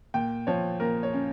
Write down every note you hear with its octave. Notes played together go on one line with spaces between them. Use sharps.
A#2 G5
F3 C#5
A#2 A#4
C#5
C#4